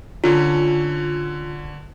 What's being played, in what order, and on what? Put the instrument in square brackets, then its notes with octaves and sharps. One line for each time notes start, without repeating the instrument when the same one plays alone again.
[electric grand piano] D3 C#4 [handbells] F4